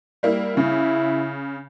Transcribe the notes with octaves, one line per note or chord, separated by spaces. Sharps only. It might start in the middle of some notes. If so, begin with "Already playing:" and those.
G3 A#3 E4
C#3 E4